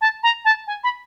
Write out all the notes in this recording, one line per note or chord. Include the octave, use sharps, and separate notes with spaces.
A5
A#5
A5
G#5
B5